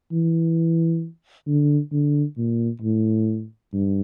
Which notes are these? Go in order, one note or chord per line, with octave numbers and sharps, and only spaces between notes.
E3
D3
D3
A#2
A2
G2